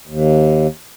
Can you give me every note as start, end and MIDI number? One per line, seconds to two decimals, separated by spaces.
0.08 0.67 39